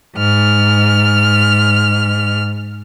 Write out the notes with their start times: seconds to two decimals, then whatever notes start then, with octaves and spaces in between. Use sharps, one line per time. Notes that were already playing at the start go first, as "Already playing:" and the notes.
0.15 G#2 F6